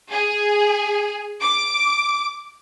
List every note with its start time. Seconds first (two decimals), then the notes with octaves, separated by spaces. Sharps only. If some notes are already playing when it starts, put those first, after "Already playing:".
0.11 G#4
1.40 D6